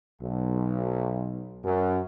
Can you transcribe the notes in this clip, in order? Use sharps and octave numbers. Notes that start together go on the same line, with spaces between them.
B1
F#2